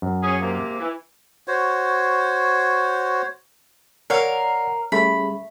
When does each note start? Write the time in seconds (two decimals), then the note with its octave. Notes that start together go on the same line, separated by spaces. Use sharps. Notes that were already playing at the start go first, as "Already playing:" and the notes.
0.02 F#2
0.23 C#4 G#4
0.41 G#2 C3 A#3
0.79 E3
1.48 F#4 C5 C#5
4.10 A#4 C#5 D5 F5 F#5
4.92 G3 A3 C#4 G#4 B5